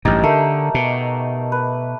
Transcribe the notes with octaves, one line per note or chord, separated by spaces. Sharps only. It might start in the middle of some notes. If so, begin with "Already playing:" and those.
A1 G2 D#4 G4
D3 A3 A#4
B2
B4